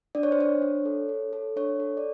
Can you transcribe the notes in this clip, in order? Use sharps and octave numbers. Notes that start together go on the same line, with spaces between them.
D4 D5
C#5
C5
D4 C#5
D4
A4
A4
A4
D4 C#5
A4
D5